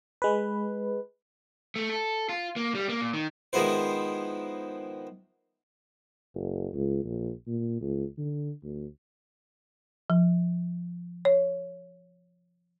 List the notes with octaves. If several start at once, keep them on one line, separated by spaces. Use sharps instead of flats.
G#3 B4
A3
A4
F4
A#3
G3
A#3
A#2
D#3
D#3 F3 G#3 B3 E4 C5
F#1
C#2
A#1
A#2
C#2
D3
D2
F3
C#5